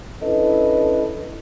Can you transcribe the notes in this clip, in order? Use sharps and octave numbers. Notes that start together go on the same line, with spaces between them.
C#4 D4 E4 A4 B4 D#5